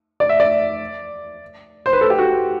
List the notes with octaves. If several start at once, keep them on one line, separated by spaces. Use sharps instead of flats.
D5
E5
D5
C5
B4
A4
G4
F#4